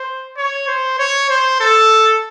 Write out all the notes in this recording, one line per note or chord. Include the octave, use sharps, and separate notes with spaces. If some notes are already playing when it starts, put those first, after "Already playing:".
Already playing: C5
C#5
C5
C#5
C5
A4